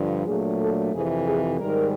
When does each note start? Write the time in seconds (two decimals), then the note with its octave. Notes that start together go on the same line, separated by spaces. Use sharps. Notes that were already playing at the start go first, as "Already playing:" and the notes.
Already playing: G2 D3 F3
0.26 A#2 F#3 A3 D4 G#4
0.59 A4
0.92 F2 C3 E3 G#4
1.25 G#4
1.57 G#2 D#3 G3 A#4